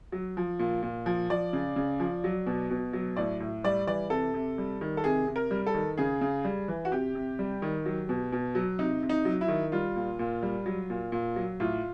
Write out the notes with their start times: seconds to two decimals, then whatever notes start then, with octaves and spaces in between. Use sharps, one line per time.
0.12 F#3
0.37 F3
0.59 A#2
0.83 A#2
1.06 F3
1.30 F3 D5
1.53 C#3
1.76 C#3
2.00 F3
2.24 F#3
2.47 B2
2.70 B2
2.93 F#3
3.17 A2 D5
3.40 A2
3.64 G3 D5
3.87 E3 D5
4.10 C3 A4
4.34 C3
4.58 G3
4.81 D#3
4.97 A4
5.04 C3 G#4
5.27 C3
5.36 A#4
5.51 G3
5.67 A4
5.74 D#3
5.98 C#3 G#4
6.21 C#3
6.45 G3
6.68 E3
6.85 F#4
6.92 C3 G4
7.15 C3
7.39 G3
7.62 D#3
7.85 F#3
8.09 B2
8.33 B2
8.55 F#3
8.79 C3 D#4
9.03 C3
9.09 D#4
9.25 F#3
9.41 E4
9.48 D#3
9.72 G3 F4
9.96 A#2
10.19 A#2
10.43 G3
10.66 F#3
10.90 A#2
11.12 A#2
11.36 F#3
11.60 A2 F4